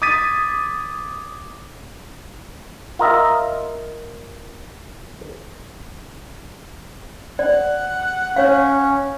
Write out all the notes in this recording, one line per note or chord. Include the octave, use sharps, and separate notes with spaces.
D6 D#6 G#6 A6 B6 D#7
F4 A#4 D#5 E5
D5 F#5
C#4 C#5 F5